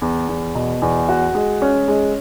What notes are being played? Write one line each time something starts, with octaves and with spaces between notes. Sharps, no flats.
E2
E2
B2
E2
F#4
G#3
C#4
G#3